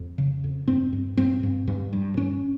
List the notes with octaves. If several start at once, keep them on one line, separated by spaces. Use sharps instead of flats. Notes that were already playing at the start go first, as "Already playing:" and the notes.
Already playing: F2
C#3
F2
G2 C4
G2
G2 C4
G2
G2
G2
G2 C#4